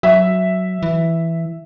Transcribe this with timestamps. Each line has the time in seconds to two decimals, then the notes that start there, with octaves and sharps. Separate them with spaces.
0.03 F#3 E5
0.83 E3